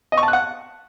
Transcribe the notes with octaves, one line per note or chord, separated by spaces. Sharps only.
D#5
C#6
A5
F#6
F#5